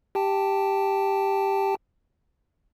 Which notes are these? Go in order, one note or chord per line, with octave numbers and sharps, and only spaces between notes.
G4 G5 A5